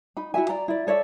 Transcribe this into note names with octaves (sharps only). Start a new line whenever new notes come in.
D#4 B5
E4 F#4 E5 G#5
D5 A#5
E4 D5
A4 C#5 D5 E5